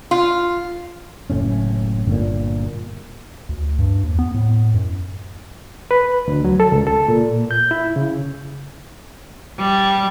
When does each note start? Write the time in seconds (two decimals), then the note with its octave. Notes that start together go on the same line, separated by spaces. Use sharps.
0.11 F4
1.30 F#1 A2 C#4
2.07 G1 A#2
3.49 D2
3.79 G2
4.03 D#2
4.19 B3
4.34 A2
4.74 F#2
5.91 B4
6.28 D2
6.45 F#3
6.60 A4
6.72 C#2
6.87 A4
7.08 A#2
7.51 G6
7.71 E4
7.96 C#3
9.58 G3